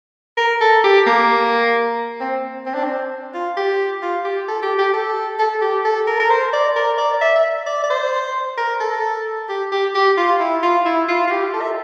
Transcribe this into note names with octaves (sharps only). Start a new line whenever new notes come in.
A#4
A4
G4
A#3
C4
C4
D4
C4
F4
G4
F4
G4
A4
G4
G4
A4
A4
G4
A4
A#4
A#4
C5
D5
A#4
D5
E5
E5
D5
D5
C5
A#4
A4
G4
G4
G4
F4
E4
F4
E4
F4
F4
G4
A4
E5